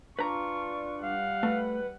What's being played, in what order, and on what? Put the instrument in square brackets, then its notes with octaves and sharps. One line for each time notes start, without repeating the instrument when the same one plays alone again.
[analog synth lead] D4 [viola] F4 C#6 [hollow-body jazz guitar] B4 A#5
[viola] G3 F#5 [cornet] F5
[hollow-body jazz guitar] A3 [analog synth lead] B4